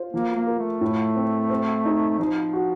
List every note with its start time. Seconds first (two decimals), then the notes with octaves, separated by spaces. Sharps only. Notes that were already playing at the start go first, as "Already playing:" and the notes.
Already playing: F4 C5
0.13 F3 A#3
0.36 A#3
0.47 A#4
0.59 A3
0.81 A2
1.15 C4
1.50 C4
1.85 D#4
2.19 F3 D#4
2.53 F#4